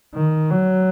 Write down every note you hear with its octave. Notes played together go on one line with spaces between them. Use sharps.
D#3
F#3